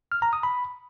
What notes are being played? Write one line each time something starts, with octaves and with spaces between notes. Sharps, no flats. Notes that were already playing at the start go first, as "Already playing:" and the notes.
F6
A#5
D#6
B5